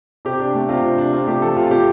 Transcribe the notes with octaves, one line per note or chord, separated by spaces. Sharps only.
C3 G4
D4
A3
C3 F4
C3
D4
C3 F4
A3 G4
F3 A4
C3 F4
C3 G4